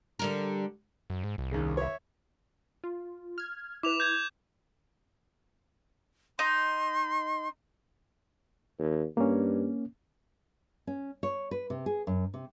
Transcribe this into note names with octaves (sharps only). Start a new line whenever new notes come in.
D3 G3 A#4
F#2
G#2
C2
D#2 C#3
C#5 E5
F4
F6 G#6
E4 B4 D6 F7
G6 G#6
D#4 C6
D#2
G2 A#3 C#4
C#4
C#5
B4
C3
G#4
F#2
C3